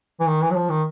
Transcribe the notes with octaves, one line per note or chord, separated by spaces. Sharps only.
E3
D#3
E3
F#3
F3
D#3